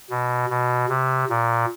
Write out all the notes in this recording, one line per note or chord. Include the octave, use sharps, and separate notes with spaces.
B2
B2
C3
A#2